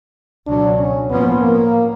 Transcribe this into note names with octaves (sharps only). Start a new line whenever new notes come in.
C#2 B2 F#3 D4
C#4
A2 F3 A#3 B3 C#4
A#3